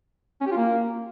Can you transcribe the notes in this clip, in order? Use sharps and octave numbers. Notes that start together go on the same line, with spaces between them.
C#4
G4
F4
A#3